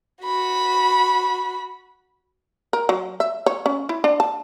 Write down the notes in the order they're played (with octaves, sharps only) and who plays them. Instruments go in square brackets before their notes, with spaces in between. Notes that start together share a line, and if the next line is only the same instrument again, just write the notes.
[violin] F#4 B5
[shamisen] A#4
F#3
E5
C#5
C#4
E4
D4
A5